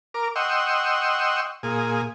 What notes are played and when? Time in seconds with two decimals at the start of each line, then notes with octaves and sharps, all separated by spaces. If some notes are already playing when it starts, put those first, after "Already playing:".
0.14 A#4 D6
0.36 D#5 F#5 G5 C6 C#6 E6
1.63 A#2 G#4